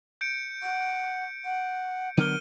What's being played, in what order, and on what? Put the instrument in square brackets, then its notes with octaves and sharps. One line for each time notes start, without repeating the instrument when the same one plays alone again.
[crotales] G6 C#7 D7
[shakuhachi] F#5
F#5
[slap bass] D3 F#3 B3 [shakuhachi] A#4 [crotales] D#7 G7